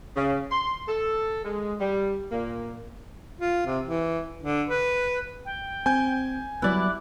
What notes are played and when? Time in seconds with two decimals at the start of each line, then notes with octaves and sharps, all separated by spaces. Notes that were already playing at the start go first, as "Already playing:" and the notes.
0.16 C#3
0.51 C6
0.88 A4
1.44 G#3
1.80 G3
2.31 A#2 A#3
3.40 F4
3.66 C3
3.85 E3
4.43 D3
4.69 B4
5.45 G5
5.86 C4 G#5 G6
6.62 F#3 G3 B3 E4 D5 F#6